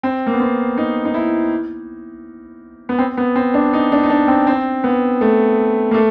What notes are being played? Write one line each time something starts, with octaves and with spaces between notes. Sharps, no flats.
C4
A#3
B3
C4
D#4
D#4
E4
B3
C4
B3
C4
D4
D#4
D4
D#4
D4
C4
C4
B3
A3
A#3
A3